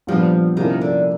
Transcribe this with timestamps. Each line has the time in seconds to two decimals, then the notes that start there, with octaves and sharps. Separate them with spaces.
0.07 A#2 F3 G3 B3 D4
0.57 C3 D#3 F3 A#3 C#4 E4
0.81 D3